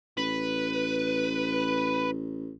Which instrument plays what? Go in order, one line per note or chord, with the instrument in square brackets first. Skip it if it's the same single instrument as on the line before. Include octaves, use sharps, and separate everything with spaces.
[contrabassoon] A1 [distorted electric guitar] B4